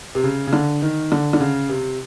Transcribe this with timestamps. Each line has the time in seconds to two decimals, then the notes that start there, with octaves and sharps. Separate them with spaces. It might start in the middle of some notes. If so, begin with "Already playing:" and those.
0.15 C3
0.24 C#3
0.47 C#3
0.53 D3
0.82 D#3
1.12 D3
1.33 D3
1.40 C#3
1.69 C3